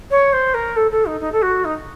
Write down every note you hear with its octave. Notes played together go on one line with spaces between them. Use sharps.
C#5
C5
A#4
A4
A4
D#4
D#4
A4
F#4
D#4